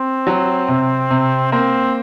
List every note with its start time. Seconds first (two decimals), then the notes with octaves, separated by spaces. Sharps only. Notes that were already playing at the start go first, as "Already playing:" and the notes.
Already playing: C4
0.27 F#3
0.68 C3
1.11 C3
1.52 A#3 C4